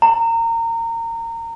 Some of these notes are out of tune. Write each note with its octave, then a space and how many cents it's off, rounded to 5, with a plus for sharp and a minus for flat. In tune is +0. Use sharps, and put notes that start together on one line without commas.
A#5 -25